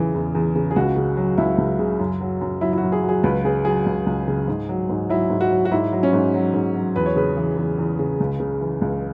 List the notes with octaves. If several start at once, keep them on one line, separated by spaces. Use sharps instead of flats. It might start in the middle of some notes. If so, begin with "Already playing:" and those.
Already playing: E2 C#3 E3
E2
E2
C#3
G#4
C#2 F#4
C#3
F#3
C#2 E4
C#2
C#3
F#2
F#3
F#2
F#3 E4
E4
F#4
F#2
G#4
F#3
G#4
C#2 B4
C#3 G#4
F#3 G#4
C#2
C#2
C#3
G#2
F#3
G#2
F#3 E4
G#2
F#4
F#3
F#4
G#2 E4
F#3
C#4
G#2
F#3
G#2
F#3
E2 B4
C#5
C#3 B4
E3
E2
E2
C#3
C#2
C#3
E3
C#2